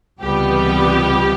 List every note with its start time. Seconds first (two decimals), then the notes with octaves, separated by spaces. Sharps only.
0.21 C#2 C3 E3 G3 B3 G4